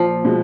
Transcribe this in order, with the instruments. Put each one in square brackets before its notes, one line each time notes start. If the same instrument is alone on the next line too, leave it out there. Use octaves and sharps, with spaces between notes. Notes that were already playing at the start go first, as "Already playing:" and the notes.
Already playing: [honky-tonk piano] A#2 [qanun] F3
[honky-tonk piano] B2 G#3